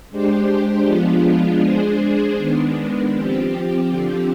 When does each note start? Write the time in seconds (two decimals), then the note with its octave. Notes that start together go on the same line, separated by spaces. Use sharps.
0.10 G#3 D4 G4 C5
0.85 F3 G#3 B3 D4 F4
1.61 G#3 D4 G#4 C5
2.37 D#3 G#3 B3 D4
3.12 F3 C4 G4
3.88 D3 F3 C4 G4